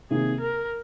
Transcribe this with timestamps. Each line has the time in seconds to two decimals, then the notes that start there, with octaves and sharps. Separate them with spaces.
0.11 C3 D#3 A#3 G#4
0.41 A#4